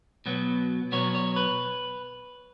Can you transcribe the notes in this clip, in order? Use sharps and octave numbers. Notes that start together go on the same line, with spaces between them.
B2 F#3 B3
B2 F#3 B3 C#5
C#5
B4